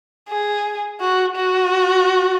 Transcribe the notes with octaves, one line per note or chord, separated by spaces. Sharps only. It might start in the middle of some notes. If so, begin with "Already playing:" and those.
G#4
F#4
F#4